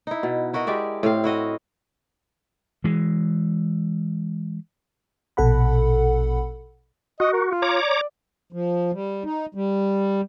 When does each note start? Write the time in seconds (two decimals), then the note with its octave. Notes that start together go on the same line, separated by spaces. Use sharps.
0.07 D#4 E4
0.23 B2
0.53 E4 F#4 A#4 D#5
0.67 G#3 G4 D5 E5
1.03 A2 C4 F5
1.24 E4 F#4 D#5 F5
2.84 E3 G#3
5.37 A#1 B2 A4 F#5 B5
7.20 F#4 D#5
7.33 A#4
7.50 F4
7.62 C#5 A#5 D6
7.82 D5
8.53 F3
8.93 G3
9.24 D#4
9.55 G3